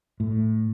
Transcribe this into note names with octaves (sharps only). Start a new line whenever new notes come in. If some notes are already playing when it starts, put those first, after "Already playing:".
A2